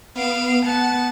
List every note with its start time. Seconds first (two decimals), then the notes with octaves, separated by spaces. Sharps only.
0.16 B3 F5 D7 E7
0.64 B3 F#5 A5